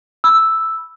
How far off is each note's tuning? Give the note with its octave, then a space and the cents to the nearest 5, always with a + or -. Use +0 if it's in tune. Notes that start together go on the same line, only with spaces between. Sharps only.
B5 -10 E6 +0